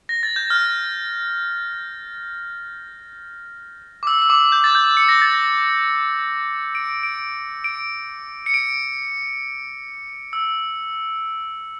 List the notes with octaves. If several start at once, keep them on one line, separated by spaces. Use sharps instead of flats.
A#6
A6
G6
F6
D6
E6
E6
D6
G6
A6
G6
C#7
A#6
A6
A#6
D7
D7
D7
C#7
D7
E6